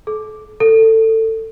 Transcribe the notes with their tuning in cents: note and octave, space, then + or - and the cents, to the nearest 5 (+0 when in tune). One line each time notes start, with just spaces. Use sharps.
A4 -35
A4 +20